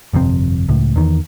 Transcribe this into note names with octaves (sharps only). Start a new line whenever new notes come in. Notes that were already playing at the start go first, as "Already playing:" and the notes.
G1 F2 C3 C4
C#2 A2
E2 D#3